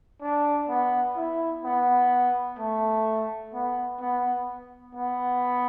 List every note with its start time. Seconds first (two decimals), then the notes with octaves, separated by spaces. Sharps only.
0.22 D4
0.69 B3
1.16 E4
1.64 B3
2.59 A3
3.54 B3
4.01 B3
4.95 B3